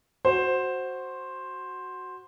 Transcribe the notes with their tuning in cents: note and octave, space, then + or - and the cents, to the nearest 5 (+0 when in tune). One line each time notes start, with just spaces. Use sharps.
F#4 +0 C5 +5